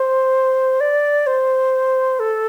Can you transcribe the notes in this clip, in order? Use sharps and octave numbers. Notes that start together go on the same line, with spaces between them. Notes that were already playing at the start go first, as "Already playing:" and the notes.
Already playing: C5
D5
C5
A4